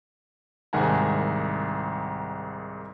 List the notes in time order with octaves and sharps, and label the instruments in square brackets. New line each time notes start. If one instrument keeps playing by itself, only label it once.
[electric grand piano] C2 G#2 D#3 F#5 G#5 A#5